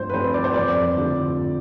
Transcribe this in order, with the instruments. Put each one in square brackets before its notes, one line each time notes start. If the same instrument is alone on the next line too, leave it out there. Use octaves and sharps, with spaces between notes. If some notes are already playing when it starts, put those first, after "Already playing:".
Already playing: [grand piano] G2 F3 A3 C4 [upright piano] C5
[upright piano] B4
[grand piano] F3 A3 C4 [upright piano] C5
[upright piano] D5
C5
[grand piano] F2 [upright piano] D5
[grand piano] D3 F3 A3